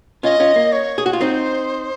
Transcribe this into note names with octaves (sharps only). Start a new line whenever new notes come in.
C#4 F4 D#5
C#4 F4
A#3
C#5
G#4
F#4
F4
C4 D#4 C5